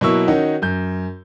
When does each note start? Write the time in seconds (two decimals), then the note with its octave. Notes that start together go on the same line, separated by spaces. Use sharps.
0.01 B2 F#3 A#3 E4 C#6 E6
0.28 D#3 C#4 D#4 F#4
0.62 F#2 G6